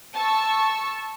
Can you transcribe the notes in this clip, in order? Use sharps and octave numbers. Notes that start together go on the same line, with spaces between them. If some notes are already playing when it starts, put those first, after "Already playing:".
A5 C#6 E6